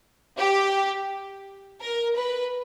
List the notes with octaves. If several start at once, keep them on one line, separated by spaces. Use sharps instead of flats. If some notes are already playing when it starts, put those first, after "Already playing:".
G4
A#4
B4